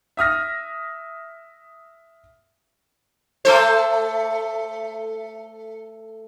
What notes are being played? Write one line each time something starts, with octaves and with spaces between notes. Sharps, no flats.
E5 D#6 F6 A#6
A3 A4 C5